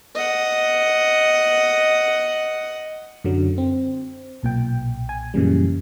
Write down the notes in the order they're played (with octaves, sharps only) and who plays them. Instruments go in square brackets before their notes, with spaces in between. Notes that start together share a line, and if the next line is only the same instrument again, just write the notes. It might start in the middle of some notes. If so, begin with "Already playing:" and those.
[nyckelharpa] D#5 F#5
[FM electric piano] F#2 D3 F#3
C4
B1 A#2 G5
G#5
F#2 A#2 C#3 E3 G3